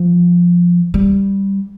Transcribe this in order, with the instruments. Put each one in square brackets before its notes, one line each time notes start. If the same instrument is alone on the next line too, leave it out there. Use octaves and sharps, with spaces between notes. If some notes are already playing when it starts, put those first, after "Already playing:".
Already playing: [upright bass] F3
G3